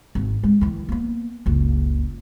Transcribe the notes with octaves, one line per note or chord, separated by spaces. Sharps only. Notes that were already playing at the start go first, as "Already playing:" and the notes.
G#1
G#3
D#3 E3
A#3 B3
F#1 C#2